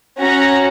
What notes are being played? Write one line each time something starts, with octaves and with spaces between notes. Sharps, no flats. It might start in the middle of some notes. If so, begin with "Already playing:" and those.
C#4 F#4 A#5